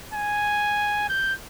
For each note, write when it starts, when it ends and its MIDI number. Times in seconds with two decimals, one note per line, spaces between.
0.14 1.06 80
1.09 1.33 91